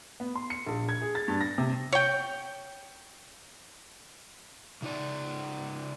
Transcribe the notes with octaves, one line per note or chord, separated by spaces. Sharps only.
B3
C6
C#7
A#1
G#6
G#4
A6
G2
A#6
C3
C#5 G5
C#3 D#4 D5